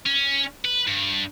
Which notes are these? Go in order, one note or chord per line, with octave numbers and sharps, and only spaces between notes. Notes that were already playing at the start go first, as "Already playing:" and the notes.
C#4
B4
G2